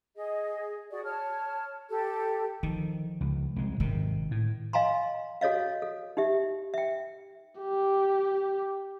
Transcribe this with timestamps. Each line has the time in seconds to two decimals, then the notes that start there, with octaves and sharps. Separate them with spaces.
0.16 G#4 D#5
0.91 F#4 G#4 D5
1.04 C#5 A5 F6
1.89 G4 A4
2.63 D#3 F3
3.21 C#2
3.56 C2 G#3
3.80 G#1 C3 D#3
4.31 A2
4.73 D#5 F5 G#5 A#5 C6
5.41 F#4 A4 C#5 D#5 F5
5.82 A4
6.17 D#4 G4 E5
6.74 E5 G5
7.60 G4